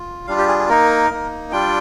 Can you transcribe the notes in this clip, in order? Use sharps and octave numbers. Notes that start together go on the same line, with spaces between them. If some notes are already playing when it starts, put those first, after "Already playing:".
Already playing: F4
G3 D4 F4 F5
G4
G#4
G#4
A#3 D#4 A#4
A#3 D#4
G3 D4 F4 G5